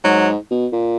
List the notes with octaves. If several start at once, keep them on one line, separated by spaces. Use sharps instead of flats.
G#2 F#3
B2
A#2